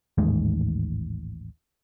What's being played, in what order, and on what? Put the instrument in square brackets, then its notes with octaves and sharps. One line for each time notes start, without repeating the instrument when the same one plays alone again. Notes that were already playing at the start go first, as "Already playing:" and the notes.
[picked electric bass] A1 D#2 G#2 G#3